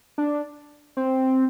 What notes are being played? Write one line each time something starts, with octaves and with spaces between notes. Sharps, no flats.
D4
C4